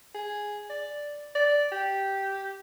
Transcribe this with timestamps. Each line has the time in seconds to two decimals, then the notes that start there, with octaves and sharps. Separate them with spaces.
0.15 G#4
0.70 D5
1.35 D5
1.72 G4